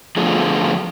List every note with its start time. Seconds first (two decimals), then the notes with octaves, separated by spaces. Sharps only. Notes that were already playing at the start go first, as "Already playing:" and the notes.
0.17 D3 F3 A3 B3 F4 G#4